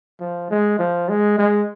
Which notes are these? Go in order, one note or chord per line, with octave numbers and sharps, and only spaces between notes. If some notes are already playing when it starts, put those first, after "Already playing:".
F3
G#3
F3
G#3
G#3